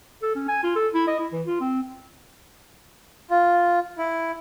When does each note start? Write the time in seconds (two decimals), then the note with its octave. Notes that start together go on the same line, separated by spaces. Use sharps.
0.23 A4
0.36 C#4
0.48 G#5
0.64 F4
0.75 A4
0.94 E4
1.08 D#5
1.19 E4
1.33 E3
1.46 F4
1.61 C4
3.30 F4
3.98 E4